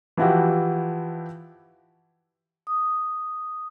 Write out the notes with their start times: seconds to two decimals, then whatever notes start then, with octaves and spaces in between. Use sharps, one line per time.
0.17 E3 F3 E4 F#4 G4
2.67 D#6